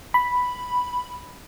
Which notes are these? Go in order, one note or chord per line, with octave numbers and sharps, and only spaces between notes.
B5